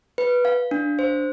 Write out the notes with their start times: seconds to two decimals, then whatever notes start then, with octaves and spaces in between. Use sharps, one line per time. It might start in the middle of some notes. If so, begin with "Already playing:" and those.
0.18 B4
0.45 F5
0.71 D4
0.99 C5